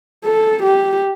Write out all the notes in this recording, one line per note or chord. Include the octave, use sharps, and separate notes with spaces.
A4
G4